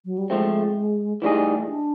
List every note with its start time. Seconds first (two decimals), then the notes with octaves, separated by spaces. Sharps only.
0.05 F#3
0.18 G3
0.30 F3 G#3 A3 C4
1.22 E3 G3 A3 B3 D#4 G#4
1.68 D4